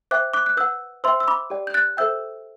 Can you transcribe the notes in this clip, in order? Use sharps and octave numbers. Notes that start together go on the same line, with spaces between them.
C5 E5 G5 D6 F#6
D6 F#6
F#6
B4 F#5 E6 G6
C5 E5 G5 C6 E6
E6
B5 D6
G4 D5 G5
G6
F#6 A6
A4 C5 E5 G5 E6 G6